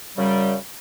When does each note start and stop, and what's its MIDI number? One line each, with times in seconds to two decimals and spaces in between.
0.17 0.56 42
0.17 0.56 49
0.17 0.56 55